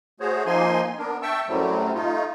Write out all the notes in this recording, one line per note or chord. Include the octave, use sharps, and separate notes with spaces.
A3 F#4 G#4 C5 C#5
F3 A#3 C4 D#4 G#5 C6
B3 D4 A#4
E5 G5 A5 C#6 E6
F#2 A2 F#3 G3 A3 C4
A3 D#4 F4